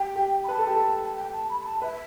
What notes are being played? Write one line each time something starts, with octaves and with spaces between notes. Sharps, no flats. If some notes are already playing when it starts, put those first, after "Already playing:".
Already playing: G4 G5
G4
B5
B4 A5
A4
G4
A4
A5
G5
A5
B5
B5
A5
B4 E5